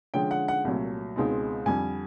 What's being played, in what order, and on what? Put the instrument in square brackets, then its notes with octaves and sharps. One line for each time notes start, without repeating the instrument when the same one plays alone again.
[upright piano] D3 F3 G#3 C#4 G5
F#5
F#5
C2 A#2 F#3 A3
C#2 B2 G#3 C4 D#4
F2 D3 G3 G#5